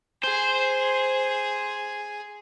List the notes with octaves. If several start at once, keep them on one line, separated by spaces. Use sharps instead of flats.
G#4 C5